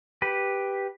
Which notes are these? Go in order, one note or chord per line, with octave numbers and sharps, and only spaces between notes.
G4 B4